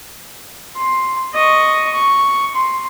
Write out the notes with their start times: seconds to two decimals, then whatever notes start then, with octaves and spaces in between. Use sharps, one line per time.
0.76 C6
1.34 D#5 C#6
1.94 C#6
2.55 C6